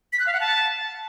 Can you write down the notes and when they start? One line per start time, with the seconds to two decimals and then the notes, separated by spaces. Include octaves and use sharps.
0.13 B6
0.20 F#6
0.26 F5
0.33 F#5
0.40 A5